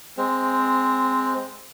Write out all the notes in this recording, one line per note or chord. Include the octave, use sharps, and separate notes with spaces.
G#3 C4